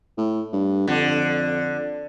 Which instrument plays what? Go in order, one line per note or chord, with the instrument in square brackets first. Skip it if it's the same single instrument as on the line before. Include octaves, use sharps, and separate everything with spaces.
[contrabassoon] A2
G2
[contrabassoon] F2 [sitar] D3